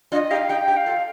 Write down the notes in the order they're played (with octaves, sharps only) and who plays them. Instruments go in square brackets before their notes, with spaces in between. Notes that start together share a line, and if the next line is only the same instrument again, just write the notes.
[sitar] D4 F4 [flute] D#5
[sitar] D#4 G4 [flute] F5
[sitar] D#4 G4 [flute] G5
[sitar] D#4 G4
[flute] F5
[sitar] F4 A4